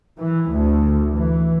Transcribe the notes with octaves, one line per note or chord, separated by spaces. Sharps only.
E3
D2
E3